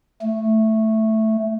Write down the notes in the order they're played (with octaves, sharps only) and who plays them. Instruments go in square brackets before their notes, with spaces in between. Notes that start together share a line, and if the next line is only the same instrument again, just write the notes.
[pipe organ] A3